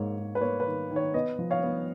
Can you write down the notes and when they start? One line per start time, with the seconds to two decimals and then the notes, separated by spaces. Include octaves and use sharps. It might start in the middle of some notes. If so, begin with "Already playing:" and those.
Already playing: G#2 A#3 C#5
0.17 G#2
0.35 B4
0.41 A#3 C#5
0.60 B4
0.66 D#3
0.91 D#3
0.96 C#5
1.14 B3 B4 D#5
1.39 F3
1.51 C#5 F5
1.63 B3